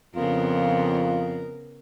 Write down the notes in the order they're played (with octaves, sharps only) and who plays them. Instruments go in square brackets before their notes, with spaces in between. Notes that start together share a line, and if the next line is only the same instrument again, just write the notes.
[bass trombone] F2 [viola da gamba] C#3 B3 [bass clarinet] F4 [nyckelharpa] A#4